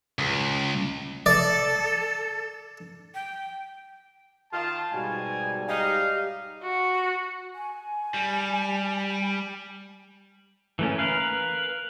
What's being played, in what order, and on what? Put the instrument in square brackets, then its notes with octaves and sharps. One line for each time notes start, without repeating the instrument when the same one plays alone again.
[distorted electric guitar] C#2
[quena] A4 [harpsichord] D5
[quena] G5
[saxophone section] D#3 F4 [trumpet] A5
[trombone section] G#2 G3 [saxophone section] B2 [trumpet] G#5
[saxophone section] D#4 [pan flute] G4 [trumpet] F5
[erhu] F#4
[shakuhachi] G#5
[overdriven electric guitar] G3
[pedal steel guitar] E3 A3 C#4
A#4 B4 F5